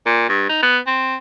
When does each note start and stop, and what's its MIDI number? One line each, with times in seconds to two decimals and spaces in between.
0.06 0.28 46
0.29 0.45 43
0.49 0.59 63
0.62 0.78 59
0.87 1.16 60